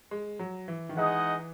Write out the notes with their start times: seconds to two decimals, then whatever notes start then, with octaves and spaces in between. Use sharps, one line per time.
0.11 G#3
0.39 F#3
0.68 E3
0.89 D#3
0.96 E3 G#3 D#4 G#4 D#5 F#5